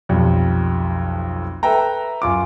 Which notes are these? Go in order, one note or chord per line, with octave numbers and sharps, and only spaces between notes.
B1 F2 G3
A4 B4 E5 G5 A#5
F#2 F4 D6